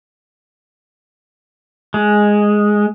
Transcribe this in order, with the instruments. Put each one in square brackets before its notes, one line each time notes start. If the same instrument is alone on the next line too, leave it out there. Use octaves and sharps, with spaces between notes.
[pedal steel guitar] G#3